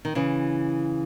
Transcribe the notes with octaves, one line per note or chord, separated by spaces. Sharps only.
D#3
C#3 E3